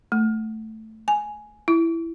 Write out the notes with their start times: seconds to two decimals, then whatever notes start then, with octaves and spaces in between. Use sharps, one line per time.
0.12 A3
1.08 G#5
1.68 E4